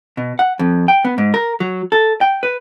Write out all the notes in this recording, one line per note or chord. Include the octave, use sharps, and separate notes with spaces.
B2
F#5
F2
G5
B3
G#2
A#4
F#3
A4
G5
B4